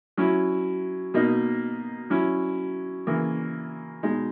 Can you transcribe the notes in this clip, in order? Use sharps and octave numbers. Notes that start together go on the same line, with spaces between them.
F#3 C#4 E4
B2 A#3 D#4
F#3 C#4 E4
C#3 E3 A#3
B2 G#3 D#4